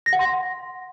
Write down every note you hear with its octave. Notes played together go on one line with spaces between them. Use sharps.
A#6
F#5
C6